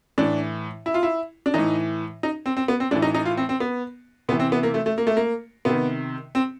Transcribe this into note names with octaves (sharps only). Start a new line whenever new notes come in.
A2 E3 D4
E4
F4
E4
D4
A2 E3 D#4
D#4
C4
C4
B3
C4
A2 E3 D4
D#4
D#4
F4
C4
C4
B3
C3 E3 B3
C4
B3
A#3
A3
A3
A#3
A3
A#3
C3 D#3 B3
C4